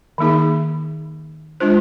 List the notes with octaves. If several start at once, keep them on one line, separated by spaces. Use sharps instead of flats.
D#3 A#3 D#4 G#4
G#3 D4 F4 C5